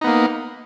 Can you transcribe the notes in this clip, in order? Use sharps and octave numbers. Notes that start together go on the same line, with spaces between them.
A#3 B3 D#4